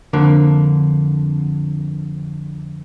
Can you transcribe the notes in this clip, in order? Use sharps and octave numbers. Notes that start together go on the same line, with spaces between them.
F2 D3 A#3